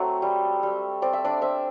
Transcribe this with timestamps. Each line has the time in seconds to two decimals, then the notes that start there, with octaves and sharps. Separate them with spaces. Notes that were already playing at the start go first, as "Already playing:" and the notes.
Already playing: F#3 A3 C4
0.22 G3
0.63 G3
1.02 C4 D5
1.13 E5
1.25 D4 D5
1.42 C4 E5